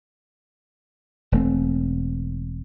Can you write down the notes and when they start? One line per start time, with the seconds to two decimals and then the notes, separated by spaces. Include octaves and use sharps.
1.32 E1 A3 C4